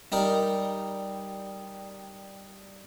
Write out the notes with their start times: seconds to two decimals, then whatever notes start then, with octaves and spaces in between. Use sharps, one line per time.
0.12 G3 D#4 A#4 G5